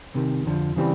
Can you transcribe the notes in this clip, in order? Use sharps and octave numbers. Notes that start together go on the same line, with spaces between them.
C2 C3 D#3
F2 D3 F3
C#3 E3 G3 C4